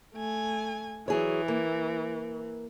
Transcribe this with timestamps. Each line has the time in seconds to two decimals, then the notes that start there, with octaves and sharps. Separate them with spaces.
0.14 A3 G#5
1.08 E3 F#3 G#4 C#5
1.48 A#3